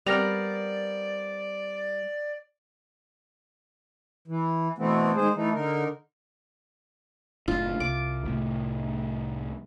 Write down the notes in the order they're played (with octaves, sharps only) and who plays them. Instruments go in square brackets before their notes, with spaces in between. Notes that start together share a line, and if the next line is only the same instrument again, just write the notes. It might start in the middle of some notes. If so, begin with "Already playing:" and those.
[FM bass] G3 [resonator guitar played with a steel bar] B3 C4 A#4 [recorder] D5 [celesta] F6 A#6 F7
[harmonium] E3
B2 E3 A3 B3 C4
D#3 G#3 G#4 C5
E3 A3 D#4
D3 D#4 A#4
[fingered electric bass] F#1 A2 D4 [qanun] F4
[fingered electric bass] C2 [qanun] D6
[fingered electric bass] C2 A2